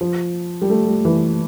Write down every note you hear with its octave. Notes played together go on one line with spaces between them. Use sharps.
F3
G3
A3
G3
E3